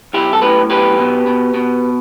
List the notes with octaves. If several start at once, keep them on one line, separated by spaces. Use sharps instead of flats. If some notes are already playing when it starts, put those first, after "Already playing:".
B1 E4 G4
A4
A2 G4 B4
B1 G4 B4
B2
B2
B2